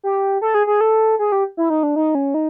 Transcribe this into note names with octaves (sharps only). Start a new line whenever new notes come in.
G4
A4
G#4
G#4
A4
G#4
G4
E4
D#4
D4
D#4
C#4
D#4